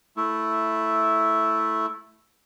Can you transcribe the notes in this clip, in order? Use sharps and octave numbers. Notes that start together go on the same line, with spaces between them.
A3 E4